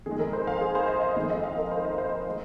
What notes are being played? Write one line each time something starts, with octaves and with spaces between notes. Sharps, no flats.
F2 D#3 G#3 G#4
A#4
C5
F5
G#4
C5
D#5
D#5
F2 D#3 G#3 C5
D#5
F5
A#4
C5
D#5
C5
C5
G#3 C5